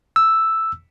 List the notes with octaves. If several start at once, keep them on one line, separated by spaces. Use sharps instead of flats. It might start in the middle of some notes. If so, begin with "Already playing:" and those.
E6